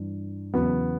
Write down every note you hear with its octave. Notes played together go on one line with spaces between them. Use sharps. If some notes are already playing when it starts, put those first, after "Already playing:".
Already playing: G2 E3
E2 C#3 F#3 B3